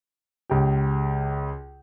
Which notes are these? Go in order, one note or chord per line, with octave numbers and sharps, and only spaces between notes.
C#2 G4